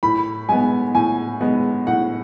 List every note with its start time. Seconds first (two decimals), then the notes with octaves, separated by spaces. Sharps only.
0.03 A2 B5
0.49 G#3 B3 G#5
0.95 A2 G#5
1.41 G#3 B3
1.87 A2 F#5